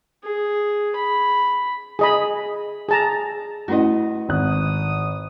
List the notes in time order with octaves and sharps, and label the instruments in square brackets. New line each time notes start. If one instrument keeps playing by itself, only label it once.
[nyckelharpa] G#4
B5
[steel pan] G#4 D#5 B5
G#4 A5 A#5
[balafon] A3 C#4 E4 [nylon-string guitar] F#4 B4 D#5
[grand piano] G#1 F#6 [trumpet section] D#6